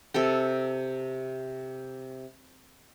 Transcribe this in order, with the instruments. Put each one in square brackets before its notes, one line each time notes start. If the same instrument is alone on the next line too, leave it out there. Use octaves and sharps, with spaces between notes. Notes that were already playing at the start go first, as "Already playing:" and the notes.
[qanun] C3 A4 G5